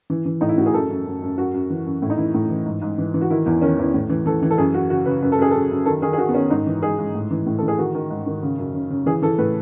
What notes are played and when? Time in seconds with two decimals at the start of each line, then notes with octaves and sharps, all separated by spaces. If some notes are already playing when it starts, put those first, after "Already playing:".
0.10 E3
0.25 E3
0.41 A2 D#4
0.49 E4
0.58 A2 F#4
0.66 G#4
0.74 F#2 A4
0.90 F#2
1.06 F#2
1.22 F#2
1.38 F#2 F#4
1.54 F#2
1.70 E3
1.86 F#2
2.02 A2 E4
2.10 D#4
2.18 E3 E4
2.34 A2
2.49 E3
2.66 G#2
2.82 G#2
2.98 E3
3.14 E3
3.21 F#4
3.30 D#3 E4
3.46 E2 E4
3.61 D#3 C#4
3.78 E2 E4
3.94 A2
4.10 E3
4.26 E3 A4
4.42 E3
4.51 A4
4.58 F#2 G#4
4.74 F#2 F#4
4.90 C#3 F#4
5.06 C#3 B4
5.22 F#2 B4
5.32 A4
5.38 F#2 G#4
5.51 F#2 A4
5.71 F#2
5.86 D#3 A4
6.02 D#3 G#4
6.13 G#4
6.18 D#3 F#4
6.29 B3
6.34 D#3 C#4
6.50 G#2 D#4
6.66 E3
6.82 G#2 G#4
6.98 G#2
7.14 A2
7.31 E3
7.46 A2
7.58 E3 A4
7.68 G#4
7.78 D#3 F#4
7.94 D#3
8.10 G#2
8.27 D#3
8.42 C#3
8.58 F#2
8.75 C#3
8.90 C#3
9.06 E3 G#4
9.22 E3 A4
9.38 A2 B4